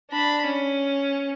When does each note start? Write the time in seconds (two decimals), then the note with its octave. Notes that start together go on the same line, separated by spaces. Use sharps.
0.11 D4 B5
0.46 C#4